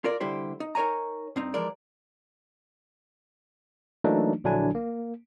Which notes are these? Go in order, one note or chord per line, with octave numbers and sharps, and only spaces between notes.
F4 A#4 D5
C2 D3 G3 E4 G4 C5
D#4
D#4 A#4 C#5 G#5 A#5
G2 C4 D#4
E3 F3 G#3 A#4 D5
E3 F#3 A3 A#3 D4 D#4
A#1 D3 F#3 D4 E4 G#5
A#3